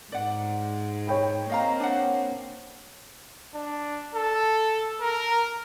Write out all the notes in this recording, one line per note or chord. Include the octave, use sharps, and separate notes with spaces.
G#2 D5 F#5
C#5 G5 B5
A#3 C4 D#5 F5 A#5
D4 F#5
D4
A4
A#4